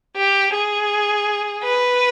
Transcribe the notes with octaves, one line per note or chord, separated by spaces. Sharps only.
G4
G#4
B4